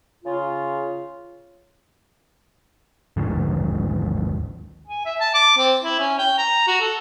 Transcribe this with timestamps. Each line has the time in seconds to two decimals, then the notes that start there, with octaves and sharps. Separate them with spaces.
0.25 C#3 F4
3.17 D#2 G#2 D3 F3
4.87 G#5
5.06 E5
5.20 A5
5.34 D6
5.58 C4
5.82 E4
6.00 C#4
6.19 G5
6.38 A#5
6.68 F#4
6.81 A4